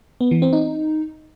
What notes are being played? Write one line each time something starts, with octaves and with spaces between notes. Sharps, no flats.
B3
E3
C4
D#4